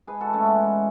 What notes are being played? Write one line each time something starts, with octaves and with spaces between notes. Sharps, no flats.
G#2 G#4 B4
F#4 A4
E3
A3 C#4
G#2 G#3 B3
E3